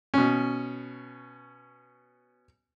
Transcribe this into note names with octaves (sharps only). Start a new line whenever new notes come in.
B2 C#4